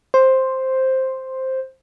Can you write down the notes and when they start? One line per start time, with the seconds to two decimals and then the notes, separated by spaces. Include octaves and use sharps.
0.14 C5